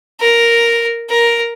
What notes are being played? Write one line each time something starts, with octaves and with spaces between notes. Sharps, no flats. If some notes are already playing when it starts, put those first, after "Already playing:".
A#4
A#4